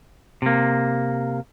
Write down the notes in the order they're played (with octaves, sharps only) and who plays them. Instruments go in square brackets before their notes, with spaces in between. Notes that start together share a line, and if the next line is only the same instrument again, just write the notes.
[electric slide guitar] C3 A#3